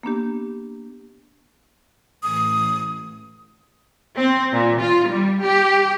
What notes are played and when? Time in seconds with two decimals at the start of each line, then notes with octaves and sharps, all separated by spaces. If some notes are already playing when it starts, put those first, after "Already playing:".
0.03 A#3 B3 D4 G4
2.23 A1 D#6
4.15 C4
4.53 A#2
4.81 F4
5.10 G3
5.43 G4